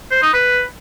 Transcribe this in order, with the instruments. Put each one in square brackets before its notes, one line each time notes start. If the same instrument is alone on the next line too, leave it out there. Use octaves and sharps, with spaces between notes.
[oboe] C5
D#4
B4